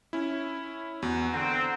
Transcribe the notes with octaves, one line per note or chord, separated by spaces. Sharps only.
C#4 E4
E2 F#4
D3 C4 F#5 A#5